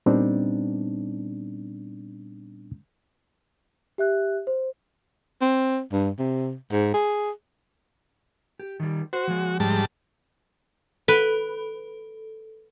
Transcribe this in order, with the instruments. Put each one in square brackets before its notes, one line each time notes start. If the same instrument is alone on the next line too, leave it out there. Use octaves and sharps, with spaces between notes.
[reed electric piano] A#2 G3 B3 C4 D4 D#4
[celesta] G4 E5 F#6
C5
[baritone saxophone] C4
G2
C3
G#2
G#4
[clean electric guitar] G4
D#3 G3
[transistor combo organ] F#4 [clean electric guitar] C5
[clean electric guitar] F3 G#3
[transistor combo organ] G#2 G3 A5
[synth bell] A4 [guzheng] B4